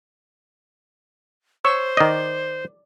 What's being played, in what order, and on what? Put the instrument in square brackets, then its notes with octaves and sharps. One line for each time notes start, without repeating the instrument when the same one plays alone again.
[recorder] C5 [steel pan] C#5 C#6 E6
[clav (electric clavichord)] D#3 D#5 [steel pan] D5